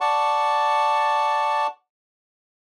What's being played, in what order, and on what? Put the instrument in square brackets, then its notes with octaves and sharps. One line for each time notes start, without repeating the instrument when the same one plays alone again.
[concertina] D5 F#5 A5 C#6